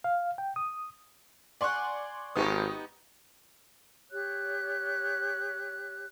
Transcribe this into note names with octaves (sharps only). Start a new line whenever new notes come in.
F5
G5
D#6
D5 F#5 G#5 C6 C#6
G#1 B3 D#4 G4 C#6 D#6
G4 C#5 F#6